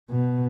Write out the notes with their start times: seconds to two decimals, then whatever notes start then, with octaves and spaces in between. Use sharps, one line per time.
0.10 B2